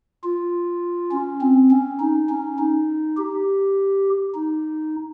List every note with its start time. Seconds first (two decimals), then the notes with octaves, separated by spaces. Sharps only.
0.24 F4
1.12 C#4
1.41 C4
1.71 C#4
2.00 D#4
2.29 C#4
2.58 D#4
3.17 G4
4.34 D#4